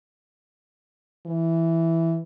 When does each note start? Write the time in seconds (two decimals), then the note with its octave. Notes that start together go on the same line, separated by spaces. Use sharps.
1.26 E3